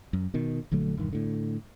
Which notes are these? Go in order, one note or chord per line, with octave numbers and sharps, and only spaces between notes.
F#2
B2 D#3
A#1 D3 F#3 A3
E1 G2 D#3
A2 D3